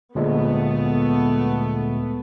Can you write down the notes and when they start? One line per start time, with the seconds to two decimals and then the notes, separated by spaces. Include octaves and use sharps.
0.15 D2 A#2 G#3 A3 B3